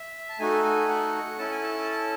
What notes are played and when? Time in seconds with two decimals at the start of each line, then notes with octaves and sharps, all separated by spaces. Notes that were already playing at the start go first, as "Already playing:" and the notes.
Already playing: E5
0.29 A5
0.39 A3 D#4 F#4 A4 G#5
0.64 G#5
0.89 F#5
1.38 C#4 E4 A4 A5
1.51 G#5
1.64 A5